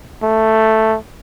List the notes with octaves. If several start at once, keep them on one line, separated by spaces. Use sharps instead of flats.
A3